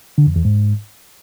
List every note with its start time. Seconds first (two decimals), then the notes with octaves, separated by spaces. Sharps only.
0.18 D3
0.27 F2
0.36 E2
0.45 G#2